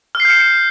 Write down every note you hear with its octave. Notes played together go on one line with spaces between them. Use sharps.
F6
C7
G6
C#7